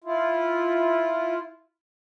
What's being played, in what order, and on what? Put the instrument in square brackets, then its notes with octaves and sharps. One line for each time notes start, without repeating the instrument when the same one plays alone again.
[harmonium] E4 F4